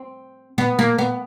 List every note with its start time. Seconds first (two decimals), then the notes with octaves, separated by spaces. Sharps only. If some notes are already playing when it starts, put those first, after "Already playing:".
Already playing: C4
0.58 B3
0.79 A#3
0.98 B3